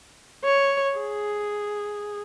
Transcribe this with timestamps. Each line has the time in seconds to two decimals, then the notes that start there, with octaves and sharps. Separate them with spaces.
0.45 C#5
0.98 G#4